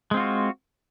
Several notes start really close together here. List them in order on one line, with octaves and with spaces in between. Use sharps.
G#3 C4 F4 F#4